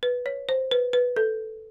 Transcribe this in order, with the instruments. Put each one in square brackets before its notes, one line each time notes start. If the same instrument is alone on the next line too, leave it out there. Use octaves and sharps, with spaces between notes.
[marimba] B4
C#5
C5
B4
B4
A4